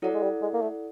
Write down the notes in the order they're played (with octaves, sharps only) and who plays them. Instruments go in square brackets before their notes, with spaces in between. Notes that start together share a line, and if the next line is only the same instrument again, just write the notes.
[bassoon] F#3 [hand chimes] E4 A4 D5 F#5
[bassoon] G#3
G3
G#3
A#3
A3